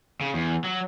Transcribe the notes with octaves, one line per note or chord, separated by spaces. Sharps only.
C#3
E2
F#3